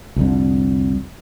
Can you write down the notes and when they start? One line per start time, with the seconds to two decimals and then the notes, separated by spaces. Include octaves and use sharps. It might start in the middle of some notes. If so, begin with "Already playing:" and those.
0.16 C2 F2 D3